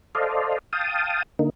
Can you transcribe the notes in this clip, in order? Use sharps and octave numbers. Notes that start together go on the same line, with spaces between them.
A4 C5 D5 D#5 F5
F5 G5 A5 D#6
D3 A#3 D#4